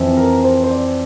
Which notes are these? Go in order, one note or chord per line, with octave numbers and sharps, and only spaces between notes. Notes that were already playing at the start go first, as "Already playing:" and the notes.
Already playing: F2 E3
A#4
C5
C5
D5